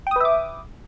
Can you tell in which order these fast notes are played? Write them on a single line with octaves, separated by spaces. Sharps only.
G5 D#6 B4 E5 D6